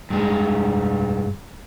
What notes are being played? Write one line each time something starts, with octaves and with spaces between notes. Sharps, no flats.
G2 G#3